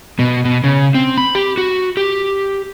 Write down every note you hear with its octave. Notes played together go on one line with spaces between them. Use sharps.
B2
B2
C#3
C4
B5
G4
F#4
G4